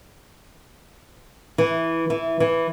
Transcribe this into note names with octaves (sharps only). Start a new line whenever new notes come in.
E3
E3
E3